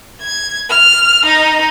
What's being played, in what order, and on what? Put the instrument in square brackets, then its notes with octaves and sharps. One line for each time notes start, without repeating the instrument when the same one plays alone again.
[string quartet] G#6
F6
D#4